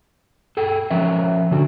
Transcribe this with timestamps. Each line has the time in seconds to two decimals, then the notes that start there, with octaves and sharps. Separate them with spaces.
0.57 G#4 A4 G5
0.91 F3 C#4 A#4 E5
1.51 D3 D4 F#4